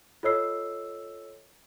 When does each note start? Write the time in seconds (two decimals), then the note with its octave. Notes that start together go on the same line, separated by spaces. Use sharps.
0.23 F4 A4 C#5 D#5 E6 C7